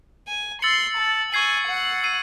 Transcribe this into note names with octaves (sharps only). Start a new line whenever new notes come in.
G#5
C6 E6 A6 C#7 F#7
A5
G#5 C#6 G#6 C7 F#7
F#5
E6 C7 D#7